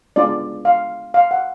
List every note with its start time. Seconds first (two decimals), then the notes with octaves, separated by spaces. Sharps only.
0.16 G#3 B3 D4 F4 D5
0.65 F5
1.14 F5
1.31 F#5